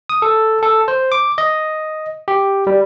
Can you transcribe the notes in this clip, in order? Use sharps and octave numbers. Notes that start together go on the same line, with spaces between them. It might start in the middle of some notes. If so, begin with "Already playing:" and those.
D#6
A4
A4
C5
D6
D#5
G4
G3